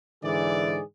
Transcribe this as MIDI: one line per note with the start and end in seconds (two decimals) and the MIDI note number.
0.23 0.81 44
0.23 0.81 50
0.23 0.81 52
0.23 0.81 68
0.23 0.81 74